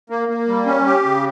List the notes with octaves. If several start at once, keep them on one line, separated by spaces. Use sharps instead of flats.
A#3
A#3
G3
C#4
G4
C#3